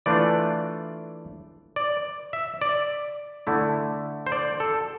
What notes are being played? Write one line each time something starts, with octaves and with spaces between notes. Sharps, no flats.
E3 A3 D4 F4 D5
D5
E5
D5
D3 A3 E4
C5
D5
A4